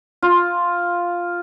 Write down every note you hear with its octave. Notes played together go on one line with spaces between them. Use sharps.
F4